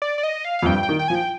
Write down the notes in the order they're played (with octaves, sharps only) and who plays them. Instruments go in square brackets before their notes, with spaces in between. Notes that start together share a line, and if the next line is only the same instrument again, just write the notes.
[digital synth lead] D5
D5
D#5
F5
F5
[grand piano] F2
[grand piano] G2 [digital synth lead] G5
[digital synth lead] G5
[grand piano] D#3
[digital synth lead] G5
[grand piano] F3 [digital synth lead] G#5
[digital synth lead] G5